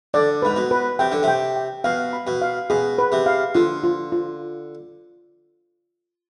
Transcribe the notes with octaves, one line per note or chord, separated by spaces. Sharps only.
D3 D5
G#2 B4
B2
B4
C3 G5
D3
C3 G5
G5
B2 F5
B5
B2
F5
B2 G#4
B4
C3
F5
D3 F4
F4
F4